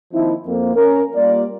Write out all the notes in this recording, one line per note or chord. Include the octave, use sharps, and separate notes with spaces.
D#3 F3 A#3 C4 D#4 E4
F2 A#3 C4
C#4 A#4
G3 A#3 F4 D5